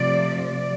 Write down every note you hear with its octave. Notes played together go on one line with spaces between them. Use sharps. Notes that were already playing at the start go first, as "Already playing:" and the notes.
Already playing: C3 F3 A3 D5
D5